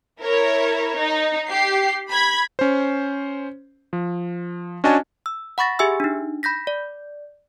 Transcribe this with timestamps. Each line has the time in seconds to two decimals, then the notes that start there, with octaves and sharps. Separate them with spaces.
0.21 E4 A#4 C#5
0.96 D#4
1.47 G4 C7
2.10 B5 G#6
2.59 C#4 C5
3.93 F3
4.84 C#4 D4 F#4 D#5 G#5 A5
5.26 E6
5.58 F#5 B5 C#6 A6 A#6
5.79 G4 G#4 E5 G#5 E6
6.00 D4 D#4
6.43 B5 G6 A#6 B6
6.67 D5